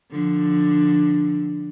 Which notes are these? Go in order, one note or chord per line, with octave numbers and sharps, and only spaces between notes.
D3 F3 D4